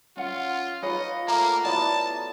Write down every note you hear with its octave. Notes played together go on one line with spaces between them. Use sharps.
C#4 F4 F#5
D#4 F4 G#4 B4 C#5 D#5
A3 A#3 F#5 A#5 D6
F#3 B3 E4 D5 D#5 A5